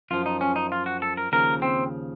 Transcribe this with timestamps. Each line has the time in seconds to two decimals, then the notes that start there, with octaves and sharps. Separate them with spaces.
0.11 F#2 F3 F4
0.26 D#4
0.41 C#4
0.56 D#4
0.72 F4
0.86 F#4
1.02 A4
1.17 A#4
1.32 D#2 C#3 F3 A#4
1.62 C4